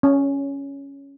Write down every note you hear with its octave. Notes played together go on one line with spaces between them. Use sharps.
C#4